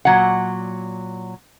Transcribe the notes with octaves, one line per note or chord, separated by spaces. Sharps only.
A#2 F#3 F#5